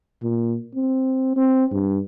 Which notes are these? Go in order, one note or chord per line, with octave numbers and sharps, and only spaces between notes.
A#2
C4
C4
G2